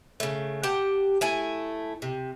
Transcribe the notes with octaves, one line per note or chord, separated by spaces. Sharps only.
C#3 A3
G4 F#5 A5
A3 E4 G#5
C3